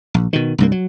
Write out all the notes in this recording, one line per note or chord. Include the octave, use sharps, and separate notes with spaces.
A#1
B2 D#3
C2 G2 A#3
F#3